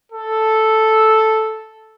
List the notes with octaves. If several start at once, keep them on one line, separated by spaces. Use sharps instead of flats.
A4